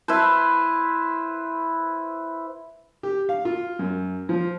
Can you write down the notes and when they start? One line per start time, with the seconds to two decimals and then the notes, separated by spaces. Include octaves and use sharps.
0.08 E4 B4 C5
3.03 G4
3.29 F5
3.45 F4
3.79 F#2
4.29 F3